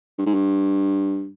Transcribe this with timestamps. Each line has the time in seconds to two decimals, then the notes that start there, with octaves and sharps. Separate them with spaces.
0.18 G2
0.26 G#2
0.34 G2